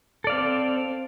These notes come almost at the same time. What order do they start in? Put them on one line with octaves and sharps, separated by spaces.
A4 D5 F5 C4